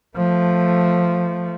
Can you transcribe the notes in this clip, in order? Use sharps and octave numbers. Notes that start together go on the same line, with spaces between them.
F3 A3